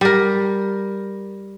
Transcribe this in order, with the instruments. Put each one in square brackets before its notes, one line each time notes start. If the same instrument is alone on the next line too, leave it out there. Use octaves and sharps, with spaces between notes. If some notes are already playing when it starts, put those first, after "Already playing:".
[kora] G3 A#4